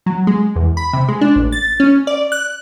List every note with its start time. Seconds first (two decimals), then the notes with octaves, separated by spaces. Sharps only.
0.06 F#3
0.27 G#3
0.56 E2
0.77 B5
0.93 C3
1.08 G#3
1.21 D4
1.36 A1
1.52 A6
1.80 C#4
2.07 D5
2.32 F#6